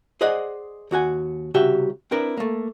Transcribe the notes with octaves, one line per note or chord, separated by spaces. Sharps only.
G#4 C5 D5 D#5 F#5
D#2 F#4 F#5 G#5
C2 C#3 F#4 G4 E5
C4 D4 E4 A#4 B4
A3 A#3